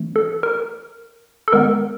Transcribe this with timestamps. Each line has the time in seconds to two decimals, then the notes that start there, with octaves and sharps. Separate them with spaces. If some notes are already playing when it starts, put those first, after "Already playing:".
Already playing: E3 A3 C4
0.16 A4
0.43 A#4
1.48 A4
1.53 D#3 G#3 B3 A#4